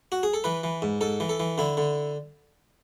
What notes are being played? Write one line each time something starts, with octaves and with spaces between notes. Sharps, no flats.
F#4
G#4
A4
E3 B4
E3
G#2
G#2 A4
E3
A4
E3
D3 E4
D3